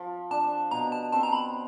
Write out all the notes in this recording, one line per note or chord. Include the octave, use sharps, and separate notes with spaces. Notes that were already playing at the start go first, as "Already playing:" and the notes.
Already playing: F3
D4 A5
B2 A#5
A5
C4 A5
A#5
B5